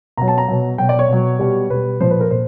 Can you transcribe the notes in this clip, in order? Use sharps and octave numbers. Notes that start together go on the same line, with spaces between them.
B2 F#3 A#5
A5
A#5
B2 F#3
B2 F#3 G5
D5
C#5
B2 F#3
B2 G3
B2 G3 B4
A#2 F3 C5
B4
A#4
A#2 C5